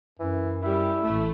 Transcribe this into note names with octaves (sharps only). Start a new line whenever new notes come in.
F#2 E3
G3 E4
A1 A3